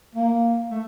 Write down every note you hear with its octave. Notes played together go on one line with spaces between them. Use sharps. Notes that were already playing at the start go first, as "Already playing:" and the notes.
A#3
A3